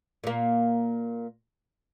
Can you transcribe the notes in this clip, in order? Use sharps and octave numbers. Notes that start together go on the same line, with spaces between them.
A#2 A#3